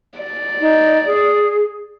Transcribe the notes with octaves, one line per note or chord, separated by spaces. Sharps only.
D5
D#4
G#4